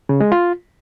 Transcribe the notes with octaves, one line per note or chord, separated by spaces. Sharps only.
C#3
G#3
F4